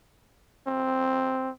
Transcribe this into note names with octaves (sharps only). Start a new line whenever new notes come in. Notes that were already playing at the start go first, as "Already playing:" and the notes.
C4